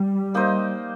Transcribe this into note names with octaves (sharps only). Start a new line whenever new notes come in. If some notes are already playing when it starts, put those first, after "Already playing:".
Already playing: G3
A#3 D#4 C5 D#5